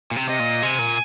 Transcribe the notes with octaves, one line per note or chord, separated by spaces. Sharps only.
A#2
C3
C3 D#5
A#2
C3 G#5
A#2